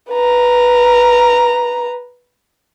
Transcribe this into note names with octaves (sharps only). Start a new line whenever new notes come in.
B4 A#5